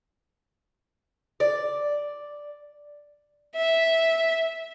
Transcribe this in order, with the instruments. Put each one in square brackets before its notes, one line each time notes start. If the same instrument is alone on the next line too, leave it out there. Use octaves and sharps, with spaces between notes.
[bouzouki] D5
[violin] E5